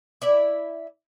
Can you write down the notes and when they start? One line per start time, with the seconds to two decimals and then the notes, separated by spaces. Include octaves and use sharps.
0.22 E4 D5 E5